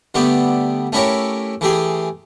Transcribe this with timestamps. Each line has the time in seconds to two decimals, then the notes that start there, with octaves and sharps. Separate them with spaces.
0.15 D3 G3 A3 B3 G4
0.92 A3 C#4 E4 G4 A#4 C#5
1.61 E3 A3 G4 G#4